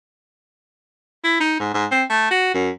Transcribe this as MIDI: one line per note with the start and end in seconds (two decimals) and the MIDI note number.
1.24 1.37 64
1.40 1.56 63
1.60 1.74 44
1.74 1.85 44
1.91 2.04 60
2.10 2.31 57
2.31 2.49 66
2.54 2.70 42